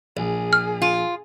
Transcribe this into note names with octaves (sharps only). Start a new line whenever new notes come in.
A#1 G#4
F6
F4